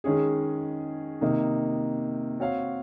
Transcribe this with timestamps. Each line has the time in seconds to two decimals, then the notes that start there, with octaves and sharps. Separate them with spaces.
0.04 D#3 G#3 C#4 G#4
1.21 C3 D#3 A#3 D#4
2.40 C4 F#4 C#5 F5